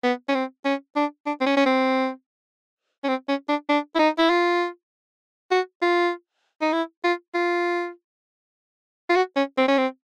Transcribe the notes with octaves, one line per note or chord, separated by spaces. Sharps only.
B3
C#4
C4
C#4
D4
D4
C4
C#4
C#4
C4
C#4
C4
C#4
D4
D4
E4
D#4
E4
F4
F#4
F4
D#4
E4
F4
F4
F4
F#4
C#4
C4
C#4
C4